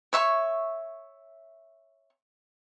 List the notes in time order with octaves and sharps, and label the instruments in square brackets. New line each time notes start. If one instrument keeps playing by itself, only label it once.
[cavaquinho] C#5 E5 C#6